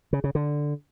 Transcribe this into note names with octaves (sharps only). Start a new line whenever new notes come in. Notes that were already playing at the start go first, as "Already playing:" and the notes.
C#3
C#3
D3